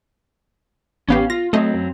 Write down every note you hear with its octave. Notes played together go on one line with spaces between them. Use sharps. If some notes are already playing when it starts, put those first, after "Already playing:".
A1 B3 C#4 G4 F5
F4 A#6
F#3 A3 C4 D#5
F#2